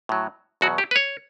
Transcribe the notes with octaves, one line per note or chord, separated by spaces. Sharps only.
A2 F#3
E2 B2 F#3 F#4
G4
B4
C#5